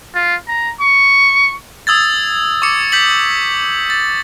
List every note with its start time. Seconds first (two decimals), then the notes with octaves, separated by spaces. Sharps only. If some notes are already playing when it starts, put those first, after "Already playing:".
0.15 F4
0.48 A#5
0.81 C#6
1.87 D#6 E6 G#6 A6
2.62 C#6 D6 C#7
2.92 G6 B6 F#7
3.90 A6